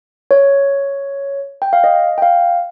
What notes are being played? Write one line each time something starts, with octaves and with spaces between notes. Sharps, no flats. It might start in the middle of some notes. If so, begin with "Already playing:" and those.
C#5
G5
F5
D#5
G5
F5